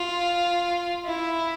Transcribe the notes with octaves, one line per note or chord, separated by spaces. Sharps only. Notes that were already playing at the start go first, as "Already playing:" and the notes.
Already playing: F4
E4